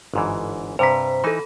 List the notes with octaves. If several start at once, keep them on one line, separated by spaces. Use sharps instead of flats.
G1 G#2 E3
G2 C3 C5 A#5 B6
E3 D#4 A4 B5